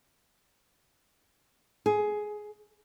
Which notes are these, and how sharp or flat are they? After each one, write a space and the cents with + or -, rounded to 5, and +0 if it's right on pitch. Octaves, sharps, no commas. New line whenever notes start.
G#4 +15